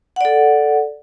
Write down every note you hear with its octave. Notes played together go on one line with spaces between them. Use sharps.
A4 D5 F#5